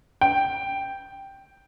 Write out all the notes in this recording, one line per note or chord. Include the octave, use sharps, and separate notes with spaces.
G5